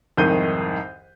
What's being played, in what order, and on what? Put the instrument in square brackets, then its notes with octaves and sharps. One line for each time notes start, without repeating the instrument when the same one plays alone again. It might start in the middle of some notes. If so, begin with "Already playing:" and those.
[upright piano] C2 F2 G#2 D#3 G6 D#7